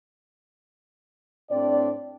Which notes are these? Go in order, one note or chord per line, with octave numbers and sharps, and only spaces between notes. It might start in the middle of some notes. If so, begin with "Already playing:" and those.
A2 C4 D4 D5